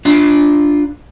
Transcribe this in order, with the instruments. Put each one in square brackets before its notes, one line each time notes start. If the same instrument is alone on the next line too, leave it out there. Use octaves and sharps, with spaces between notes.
[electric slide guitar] D4 F4